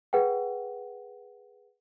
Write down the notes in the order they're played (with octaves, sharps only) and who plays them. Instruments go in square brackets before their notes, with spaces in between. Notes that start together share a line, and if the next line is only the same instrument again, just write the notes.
[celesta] G#4 B4 F#5 G5